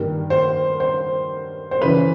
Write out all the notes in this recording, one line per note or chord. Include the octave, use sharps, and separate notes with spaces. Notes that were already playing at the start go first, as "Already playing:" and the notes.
Already playing: G2 D#3 G3 A#3
C5
C5
C5
F#2 C#3 E3 B4